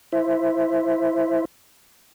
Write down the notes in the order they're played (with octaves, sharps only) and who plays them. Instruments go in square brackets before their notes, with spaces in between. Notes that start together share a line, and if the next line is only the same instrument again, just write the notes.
[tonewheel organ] E4 C5 E5